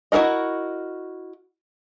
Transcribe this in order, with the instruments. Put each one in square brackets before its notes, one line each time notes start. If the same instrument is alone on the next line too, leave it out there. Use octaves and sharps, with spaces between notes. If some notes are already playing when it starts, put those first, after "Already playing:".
[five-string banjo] E4 F#4 G#4 A#4 D#5